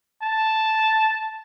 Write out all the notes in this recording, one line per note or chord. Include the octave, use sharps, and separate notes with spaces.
A5